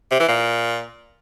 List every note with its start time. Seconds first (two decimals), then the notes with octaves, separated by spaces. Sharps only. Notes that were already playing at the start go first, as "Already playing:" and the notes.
0.11 C3
0.20 E3
0.29 A#2